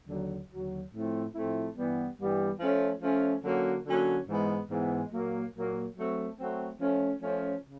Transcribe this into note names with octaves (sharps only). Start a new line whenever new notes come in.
D#2 D3 F#3
D#2 D3 F#3
A2 F3 A3 C4 E4
A2 F3 A3 C4 E4
G2 E3 G3 B3
G2 E3 G3 B3
F3 A3 C#4
F3 A3 C#4
D3 F#3 A#3 C#4 F#4
D3 F#3 A#3 C#4 F#4
G#2 E3 G#3 B3
G#2 E3 G#3 B3
A#2 F#3 A#3
A#2 F#3 A#3
F#3 A3 C4
F#3 A3 C4
F3 A3 C#4
F3 A3 C#4
C#3